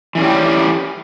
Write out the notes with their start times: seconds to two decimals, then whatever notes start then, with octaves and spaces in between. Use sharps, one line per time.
0.15 E3
0.18 C#4
0.20 G3
0.23 G4